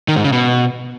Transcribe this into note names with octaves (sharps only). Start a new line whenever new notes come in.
D#3
G#2
C#3
B2